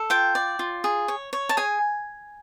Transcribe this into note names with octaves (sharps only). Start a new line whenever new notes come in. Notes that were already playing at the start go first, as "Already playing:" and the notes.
Already playing: A4
F4 G5
D5
F4
G#4
C#5
C#5
A5
G#4 G#5